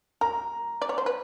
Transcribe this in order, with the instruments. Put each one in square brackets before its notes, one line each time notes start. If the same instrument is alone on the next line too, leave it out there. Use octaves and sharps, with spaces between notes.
[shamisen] A#4 [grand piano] A#5
[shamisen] D5
C#5
C5
B4